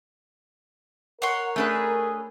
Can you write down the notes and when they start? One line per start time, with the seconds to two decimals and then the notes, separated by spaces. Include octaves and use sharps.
1.22 A#4 C#5 F#5 C6
1.56 A3 D4 G#4 B4